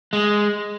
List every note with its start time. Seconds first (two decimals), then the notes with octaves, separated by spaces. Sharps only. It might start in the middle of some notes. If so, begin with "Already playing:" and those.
0.13 G#3